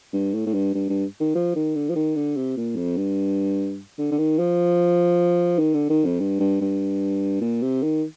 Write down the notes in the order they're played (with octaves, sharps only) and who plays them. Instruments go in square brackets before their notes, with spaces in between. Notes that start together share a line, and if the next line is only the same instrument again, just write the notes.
[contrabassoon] G2
A2
A2
G2
G2
G2
D#3
F3
D#3
D3
F3
D#3
D3
C3
A#2
F2
G2
D3
D3
D#3
F3
D#3
D3
D#3
F2
G2
G2
G2
A#2
C3
D#3